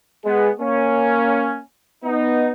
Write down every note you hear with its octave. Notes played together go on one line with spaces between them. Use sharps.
G#3 B3
A#3 C#4
B3 D#4